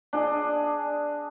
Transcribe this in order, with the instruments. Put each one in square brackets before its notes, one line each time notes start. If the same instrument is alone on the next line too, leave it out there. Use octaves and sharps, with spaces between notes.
[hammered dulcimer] D4 G#4 D#5